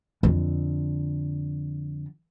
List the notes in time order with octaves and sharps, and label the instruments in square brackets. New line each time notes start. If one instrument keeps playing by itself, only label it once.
[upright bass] F2 D3